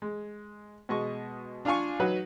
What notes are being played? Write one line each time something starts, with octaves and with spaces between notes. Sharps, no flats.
G#3
B2 G#3 D#5 C#6
D4 F4 F5 G#5 C#6
F#3 D#4 F#4 B4